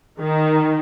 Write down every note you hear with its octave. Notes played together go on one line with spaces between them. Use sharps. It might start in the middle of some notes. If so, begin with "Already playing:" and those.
D#3